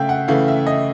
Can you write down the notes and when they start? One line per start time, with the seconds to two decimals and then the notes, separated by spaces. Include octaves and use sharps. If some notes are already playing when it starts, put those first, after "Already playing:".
Already playing: C#3 A3 E5 F5 G5
0.09 F#5
0.28 C#3 E3 A3 F5
0.48 E5
0.67 D#5